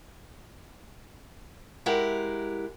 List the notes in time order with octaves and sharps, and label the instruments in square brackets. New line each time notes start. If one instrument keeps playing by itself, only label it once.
[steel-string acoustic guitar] G#3 E4 G4 A#4 F#5